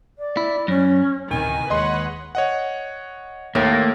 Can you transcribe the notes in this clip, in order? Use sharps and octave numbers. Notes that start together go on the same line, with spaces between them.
D5
E4
F#2 C#4
D1 C3 D#3 E3 G#5
D#2 G#3 B4 C#5 D#5 F#5 C6
C#5 D#5 F#5
D#2 A2 A#3